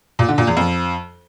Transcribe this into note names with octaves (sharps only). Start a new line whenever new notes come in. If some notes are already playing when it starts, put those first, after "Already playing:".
A#2
D3
A#2
E2
F2